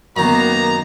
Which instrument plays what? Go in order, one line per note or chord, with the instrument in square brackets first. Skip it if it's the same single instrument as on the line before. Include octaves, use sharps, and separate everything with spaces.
[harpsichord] F#2 D#3 [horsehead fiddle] A#3 B3 [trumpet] A#5